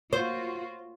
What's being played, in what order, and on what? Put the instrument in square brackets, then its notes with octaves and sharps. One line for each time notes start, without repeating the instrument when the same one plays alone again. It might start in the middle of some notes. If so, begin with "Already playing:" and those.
[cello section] A#3 F4 F#4 [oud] C5